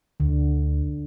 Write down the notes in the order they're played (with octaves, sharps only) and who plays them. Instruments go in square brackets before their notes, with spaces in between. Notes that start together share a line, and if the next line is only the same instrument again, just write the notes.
[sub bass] D2 [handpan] D3